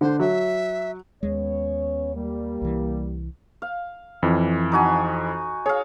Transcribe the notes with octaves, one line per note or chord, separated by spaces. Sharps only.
D3 C5
F#3 E5
D#2 G#3 B3 C#4 C#5
G3 A#3
C2 E3
F5
F2 E3
D#4 F#4 G#5
G#4 C#5 F5